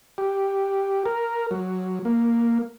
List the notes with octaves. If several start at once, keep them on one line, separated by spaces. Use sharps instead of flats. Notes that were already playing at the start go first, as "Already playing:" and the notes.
G4
A#4
F#3
A#3